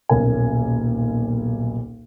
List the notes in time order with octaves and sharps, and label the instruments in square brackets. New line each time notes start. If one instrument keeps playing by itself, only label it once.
[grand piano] D#1 B1 A#3 C#4 A#4 G#5